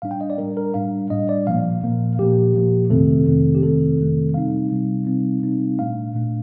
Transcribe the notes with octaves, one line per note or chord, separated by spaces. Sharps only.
A2 G3 D4 F5
G5
D#5
D5
A2 G3 D4 A#4
A#4
A2 G3 D4 F5
A2 G3 D4 D#5
D5
A#2 F3 A#3 F5
A#2 F3 A#3
A#2 F3 A#3 G4
A#2 F3 A#3
F2 C3 D#3 A3 C4 A4
F2 C3 D#3 A3 C4
G4
F2 C3 D#3 A3 C4 A4
F2 C3 D#3 A3 C4
C3 G3 C4 D#4 F5
C3 G3 C4 D#4
C3 G3 C4 D#4
C3 G3 C4 D#4
A#2 A3 D4 F5
A#2 A3 D4